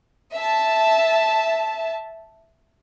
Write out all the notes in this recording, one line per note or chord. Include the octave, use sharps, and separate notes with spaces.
E5 A5